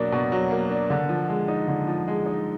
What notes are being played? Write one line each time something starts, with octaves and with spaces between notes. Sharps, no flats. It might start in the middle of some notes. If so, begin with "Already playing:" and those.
Already playing: B2 F#3 A#3 D4
B2
F#3
A#3
D4
D3
F3
G#3
D#4
D3
F3
G#3
D#4